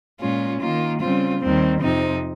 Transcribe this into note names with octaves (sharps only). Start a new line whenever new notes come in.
A#2 G#3 C#4 F4
D#3 A#3 F4
C#3 G3 C4 F4
D#2 D#3 G3 C4
F2 C3 F3 C4 D#4